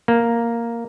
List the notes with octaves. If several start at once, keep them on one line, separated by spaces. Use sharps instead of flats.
A#3